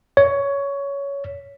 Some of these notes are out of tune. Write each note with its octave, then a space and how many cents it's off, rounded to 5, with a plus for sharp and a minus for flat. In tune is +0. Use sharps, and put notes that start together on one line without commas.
C#5 +15